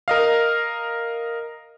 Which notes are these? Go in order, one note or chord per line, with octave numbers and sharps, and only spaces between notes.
A#4 D#5 F5